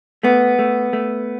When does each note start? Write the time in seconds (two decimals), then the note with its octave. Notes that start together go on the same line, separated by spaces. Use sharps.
0.23 A3 B3
0.59 A3
0.93 A3